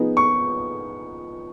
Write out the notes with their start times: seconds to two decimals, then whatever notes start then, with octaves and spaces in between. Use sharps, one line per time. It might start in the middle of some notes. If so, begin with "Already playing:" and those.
Already playing: F3 B3 D#4 G#4
0.17 C#6